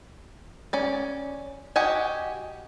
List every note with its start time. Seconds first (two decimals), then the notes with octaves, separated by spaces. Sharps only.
0.73 C#4 D5
1.76 F#4 G4 D#5 F#5 G#5